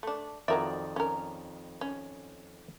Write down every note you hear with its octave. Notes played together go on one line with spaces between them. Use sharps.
A3 D4
F2 D#3 F#3 A#4 D5 E5
C#4 A#4
C#4